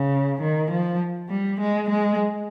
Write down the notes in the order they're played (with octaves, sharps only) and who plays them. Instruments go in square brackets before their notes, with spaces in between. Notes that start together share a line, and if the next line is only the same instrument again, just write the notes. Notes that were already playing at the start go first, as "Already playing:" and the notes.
Already playing: [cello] C#3
D#3
F3
G3
G#3
G#3